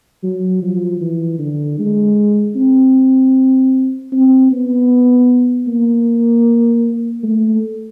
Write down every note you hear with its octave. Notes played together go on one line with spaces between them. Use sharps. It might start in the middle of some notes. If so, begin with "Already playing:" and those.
F#3
F3
E3
D3
G#3
C4
C4
B3
A#3
A3